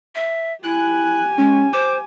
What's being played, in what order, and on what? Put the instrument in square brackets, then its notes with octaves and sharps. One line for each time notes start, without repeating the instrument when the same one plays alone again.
[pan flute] E5
[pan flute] E4 [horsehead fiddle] G4 G#5 [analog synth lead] F#6
[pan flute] G#3 [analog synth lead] C#4
[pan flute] C5 [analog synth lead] D6